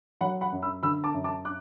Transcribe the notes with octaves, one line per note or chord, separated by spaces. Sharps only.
F#3 F#5 B5
F#5 B5
F#2
B5 E6
D3 B5 E6
A5 D6
F#2
A5 D6
D6 F#6